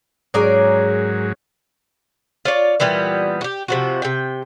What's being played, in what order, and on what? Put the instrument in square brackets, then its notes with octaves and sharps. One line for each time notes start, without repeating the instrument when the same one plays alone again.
[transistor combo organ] G#2 F#3 [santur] C#4 [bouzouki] G#4 A#4 D5
[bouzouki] F4 C#5 D5
A#2 E3 G3 B3
F#4 G4
C3 F3 F#4
C3 G5